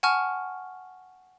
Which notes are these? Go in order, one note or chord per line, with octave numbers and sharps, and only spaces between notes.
F#5 G#5 A5 C#6 F6